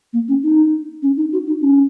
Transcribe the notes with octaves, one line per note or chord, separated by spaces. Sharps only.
A#3
C#4
D#4
C#4
D#4
F#4
D#4
C#4